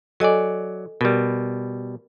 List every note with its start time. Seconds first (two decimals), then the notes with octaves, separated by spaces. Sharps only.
0.20 F#3 A4 D5 D#5 G#5
1.01 B2 G3 A#4